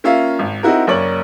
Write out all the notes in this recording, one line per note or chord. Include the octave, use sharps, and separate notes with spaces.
A#3 C#4 F4 E5 F5
G#1
C4 D#4 E4 F#4 A#4
F#1 A#3 C#5 D5 F#7